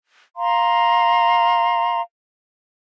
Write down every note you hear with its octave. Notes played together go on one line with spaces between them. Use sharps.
F5 A#5 C6